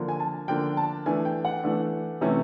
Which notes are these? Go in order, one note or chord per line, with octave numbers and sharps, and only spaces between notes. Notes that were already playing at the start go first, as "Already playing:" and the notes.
Already playing: D3 F3 A#3 D4
G#5
A5
D3 F3 A#3 D4 G5
A5
E3 A3 D4 G#5
G5
F#5
E3 A3 D4
C3 E3 A3 C#4